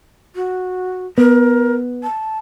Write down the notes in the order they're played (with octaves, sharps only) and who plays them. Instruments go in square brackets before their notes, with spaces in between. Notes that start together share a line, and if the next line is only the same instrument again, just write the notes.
[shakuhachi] F#4
[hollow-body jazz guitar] B3 [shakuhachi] A#4
[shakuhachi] A5